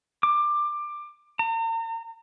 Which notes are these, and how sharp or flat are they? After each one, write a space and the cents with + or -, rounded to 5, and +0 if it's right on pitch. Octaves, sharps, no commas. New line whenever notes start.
D6 +20
A#5 -40